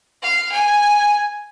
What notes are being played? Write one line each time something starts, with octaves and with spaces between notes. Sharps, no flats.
F5
G#5